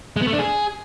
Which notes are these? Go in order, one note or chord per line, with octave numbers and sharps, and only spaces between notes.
G#3
B3
A3
D4
G#4